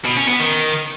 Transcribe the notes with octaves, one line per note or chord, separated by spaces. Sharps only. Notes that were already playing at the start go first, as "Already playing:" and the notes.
B2
C#4
B3
D#3